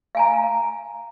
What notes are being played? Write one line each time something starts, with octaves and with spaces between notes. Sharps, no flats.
F5 G#5 A#5